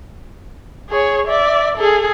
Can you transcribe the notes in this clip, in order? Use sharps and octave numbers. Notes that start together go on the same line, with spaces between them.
G#4 C#5
D5 E5
G#4 A4